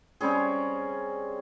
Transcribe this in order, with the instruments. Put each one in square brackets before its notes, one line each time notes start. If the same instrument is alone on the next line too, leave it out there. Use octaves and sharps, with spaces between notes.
[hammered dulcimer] G3 C4 C#4 G#4